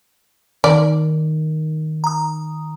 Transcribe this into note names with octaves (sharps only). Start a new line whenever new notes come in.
D#3 D5
A#5 D#6